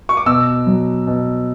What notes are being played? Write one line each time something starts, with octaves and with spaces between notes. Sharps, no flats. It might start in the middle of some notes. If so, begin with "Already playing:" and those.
C#6
D6
B2 E6
F#3
B2